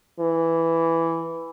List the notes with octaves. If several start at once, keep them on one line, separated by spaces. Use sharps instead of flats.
E3